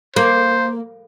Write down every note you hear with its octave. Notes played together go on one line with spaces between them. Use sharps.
A#3 C5